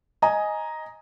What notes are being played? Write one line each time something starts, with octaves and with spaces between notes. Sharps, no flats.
D#5 G#5 A#5 D#6